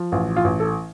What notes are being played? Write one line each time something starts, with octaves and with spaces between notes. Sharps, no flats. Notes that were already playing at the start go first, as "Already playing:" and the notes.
Already playing: F3
A1 F4
F4
A1
A4